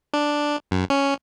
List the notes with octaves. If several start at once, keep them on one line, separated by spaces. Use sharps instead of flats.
D4
F#2
C#4